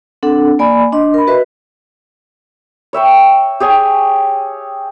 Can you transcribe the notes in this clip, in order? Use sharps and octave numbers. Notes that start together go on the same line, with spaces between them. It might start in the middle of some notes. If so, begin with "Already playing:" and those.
C4 D4 A4 F#5
A#3 D5 G#5 B5
D4 D#5 C6
A#4 B5
F#4 B4 D#5 E5
C#5 E5 G5 C#6
G4 G#4 C#5 G#5